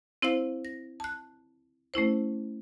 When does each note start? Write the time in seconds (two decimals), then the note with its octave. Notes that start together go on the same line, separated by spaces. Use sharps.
0.22 C4 E4 C5 F5 E6
0.65 A#6
1.00 A5 F#6
1.94 A3 C#4 E4 C5